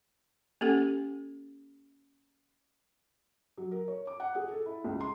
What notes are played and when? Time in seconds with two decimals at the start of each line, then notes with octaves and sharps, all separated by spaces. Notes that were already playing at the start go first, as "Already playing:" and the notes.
0.61 A#3 C#4 G4 A4 F#5
3.58 F#3
3.71 A#4
3.88 C#5
4.07 D6
4.20 F#5
4.35 G#4
4.51 A4
4.66 E4
4.84 C#2
5.01 C6